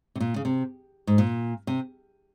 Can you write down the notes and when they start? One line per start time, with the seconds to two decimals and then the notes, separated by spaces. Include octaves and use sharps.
0.15 C3
0.20 A#2
0.36 C#3
0.45 C3
1.07 G#2
1.18 A#2
1.67 C3